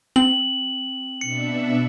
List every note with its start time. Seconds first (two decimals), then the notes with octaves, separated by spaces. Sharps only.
0.16 C4 F#7
1.21 B2 D4 E5 C#7